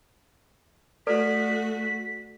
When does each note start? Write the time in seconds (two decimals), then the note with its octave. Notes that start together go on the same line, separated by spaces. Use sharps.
1.07 A3 F#4 A4 B4 D5 B6